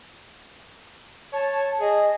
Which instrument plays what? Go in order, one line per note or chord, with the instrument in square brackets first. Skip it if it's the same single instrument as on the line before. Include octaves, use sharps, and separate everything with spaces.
[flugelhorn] C#5 [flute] A5
[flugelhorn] G#4 [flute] D#5